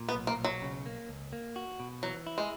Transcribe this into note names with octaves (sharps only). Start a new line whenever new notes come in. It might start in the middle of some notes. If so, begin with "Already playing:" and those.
Already playing: A#2
B3
B1
A#3
B1
F#3
C#3
A#3
C#2
A#3
F#4
B2
E3 F#3
E4
G#3